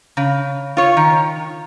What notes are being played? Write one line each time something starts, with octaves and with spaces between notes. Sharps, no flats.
C#3
F4 C#5
D#3